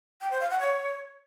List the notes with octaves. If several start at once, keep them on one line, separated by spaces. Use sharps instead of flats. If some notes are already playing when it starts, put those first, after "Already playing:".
G5
C5
F5
F#5
C#5